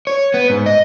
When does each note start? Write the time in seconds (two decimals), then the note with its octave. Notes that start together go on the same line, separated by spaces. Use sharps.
0.07 C#5
0.34 B3
0.50 G#2
0.66 D#5